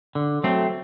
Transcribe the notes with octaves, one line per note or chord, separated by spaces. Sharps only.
D3
F#3 A3 C4